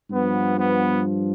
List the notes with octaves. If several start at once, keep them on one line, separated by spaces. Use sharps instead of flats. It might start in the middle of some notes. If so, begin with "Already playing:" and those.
G2 F3 B3
B3